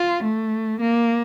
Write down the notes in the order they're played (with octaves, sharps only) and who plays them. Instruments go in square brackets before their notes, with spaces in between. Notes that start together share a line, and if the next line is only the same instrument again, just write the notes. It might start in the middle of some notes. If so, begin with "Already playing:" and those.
Already playing: [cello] F4
A3
A#3